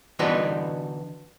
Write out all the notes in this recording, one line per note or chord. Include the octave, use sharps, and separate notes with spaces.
D3 E3 B3 D#4 F#4 B4